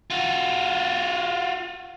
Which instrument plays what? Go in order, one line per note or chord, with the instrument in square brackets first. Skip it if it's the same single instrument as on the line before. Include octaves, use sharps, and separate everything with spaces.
[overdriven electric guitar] F4 F#4